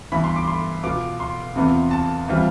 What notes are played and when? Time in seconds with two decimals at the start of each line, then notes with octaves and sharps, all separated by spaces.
0.12 G2 E3 B3 E4 B5
0.24 C6
0.36 D6
0.48 C6
0.83 B2 B3 F4 D6
1.20 C6
1.55 E2 C3 E3 B3 F4
1.91 A5
2.28 E3 G3 C4 F4